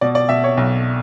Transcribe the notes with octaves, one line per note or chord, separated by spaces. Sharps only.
B2 D5
D5
B2 E5
C#5
B1